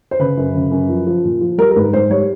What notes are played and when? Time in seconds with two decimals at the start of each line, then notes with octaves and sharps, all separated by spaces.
0.11 C5
0.19 C#3 B4
0.37 F#2
0.55 C#3
0.71 F#2
0.89 F3
1.07 F3
1.24 A#2
1.41 F3
1.58 G3 A#4
1.71 A#4
1.76 G#2 B4
1.93 G#2 C5
2.10 G3 C#5